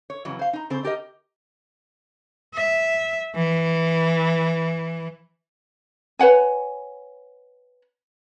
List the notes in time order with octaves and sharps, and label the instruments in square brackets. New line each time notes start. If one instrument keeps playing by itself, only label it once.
[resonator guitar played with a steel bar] C#5
F2 C#3 E3 F#3
C5 F5
D#4 A#5
C#3 C4 A4 C5
D4 G4 A#4 D#5
[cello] E5
E3
[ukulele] B4 C#5 F#5 G#5